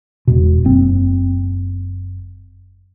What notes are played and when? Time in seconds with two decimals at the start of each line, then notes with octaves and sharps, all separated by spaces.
0.27 E1 B2
0.65 F#1 C4